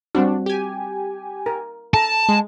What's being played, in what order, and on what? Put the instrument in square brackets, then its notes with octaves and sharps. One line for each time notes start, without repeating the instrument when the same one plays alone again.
[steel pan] G3 C4 F#4 [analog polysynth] D4
[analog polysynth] G4 G#5
[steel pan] A#4
[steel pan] A4 A#5 [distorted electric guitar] A5
[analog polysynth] G#3